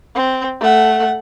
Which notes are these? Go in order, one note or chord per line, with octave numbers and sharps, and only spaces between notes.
C4
A3 F#5